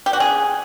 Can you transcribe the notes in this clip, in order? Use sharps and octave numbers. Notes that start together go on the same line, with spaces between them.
G4
F#4
G#4